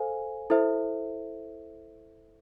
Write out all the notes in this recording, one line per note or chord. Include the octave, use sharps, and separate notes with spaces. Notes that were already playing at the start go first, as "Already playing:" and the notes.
Already playing: A4 C5 F5 G#5
E4 A4 C5 E5